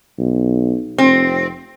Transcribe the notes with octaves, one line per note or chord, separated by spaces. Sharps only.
B1
F1 C4